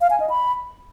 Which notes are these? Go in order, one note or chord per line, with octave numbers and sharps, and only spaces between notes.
F5
G#5
D#5
B5